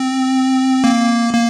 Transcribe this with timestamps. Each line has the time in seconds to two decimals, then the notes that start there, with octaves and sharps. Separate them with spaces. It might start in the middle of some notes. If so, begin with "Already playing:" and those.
Already playing: C4
0.84 A#3
1.34 A#3